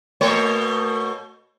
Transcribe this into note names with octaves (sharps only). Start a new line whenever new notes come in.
B2 A3 C#5